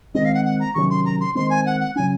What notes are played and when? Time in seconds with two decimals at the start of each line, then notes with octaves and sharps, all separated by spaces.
0.14 D#3 G#3 C4 D#5
0.25 F5
0.34 F#5
0.45 F#5
0.60 A#5
0.74 C3 D#3 F#3 C#4 C#6
0.90 C6
1.05 A#5
1.20 C6
1.35 D#3 G#3 C4 C6
1.50 G#5
1.66 F#5
1.80 F#5
1.96 C#3 F#3 C#4 G#5